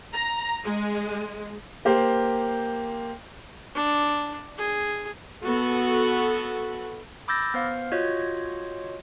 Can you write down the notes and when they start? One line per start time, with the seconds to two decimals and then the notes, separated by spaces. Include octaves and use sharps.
0.13 A#5
0.64 G#3
1.85 A#3 G4 C5
3.74 D4
4.58 G#4
5.44 B3 F#4 A4
7.28 B5 D6 E6 G6 A6 A#6
7.54 B3 C5 F5
7.92 F4 F#4 C#5 D#5 G6 G#6